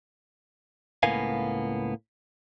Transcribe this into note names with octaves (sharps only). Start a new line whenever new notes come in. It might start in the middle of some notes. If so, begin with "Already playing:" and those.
C#2 A2 A#3 B3 F5 G#5